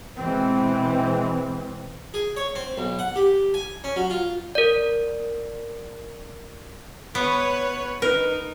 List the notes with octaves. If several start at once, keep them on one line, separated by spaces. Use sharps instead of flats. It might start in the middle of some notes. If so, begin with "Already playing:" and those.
B2 E3 G#3 C4
G#4
C#5
C4
B1
F#5
G4
G#5
C#4
F#3
F4
A#4 D5
B3 B4 C#5
D#4 A#4 B4